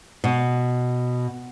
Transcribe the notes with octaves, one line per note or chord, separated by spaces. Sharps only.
B2